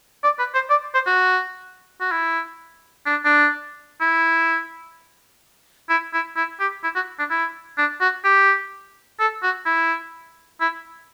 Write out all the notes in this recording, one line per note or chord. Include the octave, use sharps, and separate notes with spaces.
D5
B4
C5
D5
C5
F#4
F#4
E4
D4
D4
E4
E4
E4
E4
G4
E4
F#4
D4
E4
D4
F#4
G4
A4
F#4
E4
E4